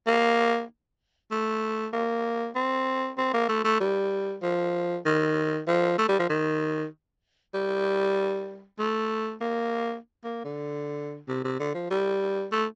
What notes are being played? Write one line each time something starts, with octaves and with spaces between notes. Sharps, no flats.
A#3
A3
A#3
C4
C4
A#3
A3
A3
G3
F3
D#3
F3
A3
G3
F3
D#3
G3
A3
A#3
A#3
D3
C3
C3
D3
F3
G3
A3